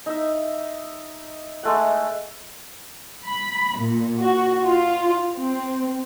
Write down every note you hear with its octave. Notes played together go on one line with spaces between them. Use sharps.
D#4 E5
G#3 A3 F#5
B5
A#2
F#4
F4
C4